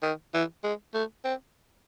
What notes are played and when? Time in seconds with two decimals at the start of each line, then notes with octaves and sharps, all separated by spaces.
0.03 D#3
0.34 E3
0.64 G#3
0.94 A3
1.25 C4